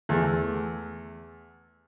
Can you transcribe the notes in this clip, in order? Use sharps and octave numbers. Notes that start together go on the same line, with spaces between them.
E2 A3